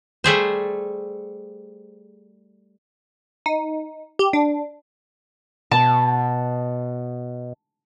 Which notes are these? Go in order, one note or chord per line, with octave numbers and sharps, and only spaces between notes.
G3 A3 G#4 C5
D#4
G4
D4
B2 A5